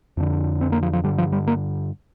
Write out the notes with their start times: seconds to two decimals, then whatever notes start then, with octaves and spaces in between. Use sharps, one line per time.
0.17 F2 D3
0.61 C4
0.72 A#3
0.83 F3
0.93 F3
1.04 G2 D3 G3
1.18 F3
1.32 G3
1.47 A#3